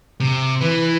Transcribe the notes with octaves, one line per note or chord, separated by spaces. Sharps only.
C3
E3 B4